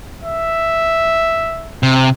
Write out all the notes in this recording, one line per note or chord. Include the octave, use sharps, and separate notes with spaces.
E5
C3